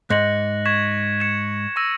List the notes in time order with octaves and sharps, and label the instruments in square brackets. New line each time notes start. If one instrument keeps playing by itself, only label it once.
[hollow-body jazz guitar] G#2 [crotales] F#6 A#6 C#7 F#7
[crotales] C#6 G#6 B6 E7
G#6 C#7 E7
C#6 E6 A#6 D#7